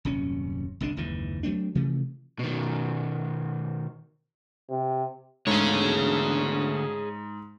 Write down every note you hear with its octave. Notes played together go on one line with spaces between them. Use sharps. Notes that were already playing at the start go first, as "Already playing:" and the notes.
D#1 F#2 C3 C#4
G1 C2 D3 D4
F#1 D#2 G#2 E3
F#3 A3 C4 D4
C3 E3 F3 A3
B2 D#3
C3
E1 G#2 D3 A3 G#4 C#5